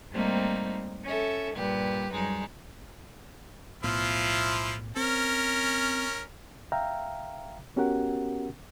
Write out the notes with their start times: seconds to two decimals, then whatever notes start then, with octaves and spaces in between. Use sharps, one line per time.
0.11 G#2 G3 A3 A#3 C4 D#4
1.04 C#4 A4 E5
1.55 G2 A#2 G4 B4
2.12 F#2 G3 G#3 D#4
3.83 B1 A2 F3 B3 E4 F4
4.96 C4 C#4 A#4
6.72 E5 F5 G5 A#5 F6
7.76 B3 C#4 F#4 G4 A#4 F#5